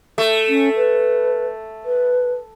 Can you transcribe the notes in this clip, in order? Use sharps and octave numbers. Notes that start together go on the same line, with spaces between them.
A3
C#4
B4
B4